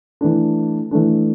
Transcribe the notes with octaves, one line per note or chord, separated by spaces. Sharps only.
E3 A3 D4
E3 A3 D4